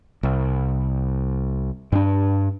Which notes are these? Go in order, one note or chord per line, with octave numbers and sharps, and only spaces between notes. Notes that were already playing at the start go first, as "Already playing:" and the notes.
C2
G2 D4